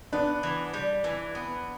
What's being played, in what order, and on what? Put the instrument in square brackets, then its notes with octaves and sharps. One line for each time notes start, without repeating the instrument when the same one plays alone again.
[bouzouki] B3 [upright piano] D4
[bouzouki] E3
G3
E3
B3